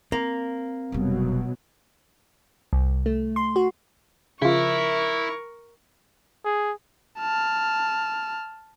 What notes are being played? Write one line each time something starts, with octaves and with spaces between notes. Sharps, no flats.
A#3 C4
F1 B2 F#3 G3
C2
A3
C6
F#4
C#3 F3 E4 A#4 C#6
G#4
A5 F6